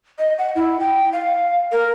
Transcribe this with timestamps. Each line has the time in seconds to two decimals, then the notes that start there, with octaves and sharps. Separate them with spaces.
0.19 D#5
0.38 F#5
0.55 E4
0.80 G5
1.12 F5
1.72 A#4